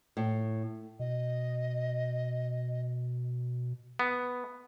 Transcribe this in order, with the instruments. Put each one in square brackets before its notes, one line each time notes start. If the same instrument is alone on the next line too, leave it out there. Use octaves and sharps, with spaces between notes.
[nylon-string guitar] A2
[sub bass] B2 [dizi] D#5
[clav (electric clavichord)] B3